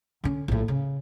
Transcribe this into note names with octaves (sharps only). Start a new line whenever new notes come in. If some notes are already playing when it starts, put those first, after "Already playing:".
D3 C#4
A#1 A2
C#3